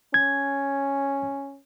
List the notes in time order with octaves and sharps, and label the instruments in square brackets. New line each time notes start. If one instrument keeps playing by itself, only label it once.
[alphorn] C#4 [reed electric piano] G#6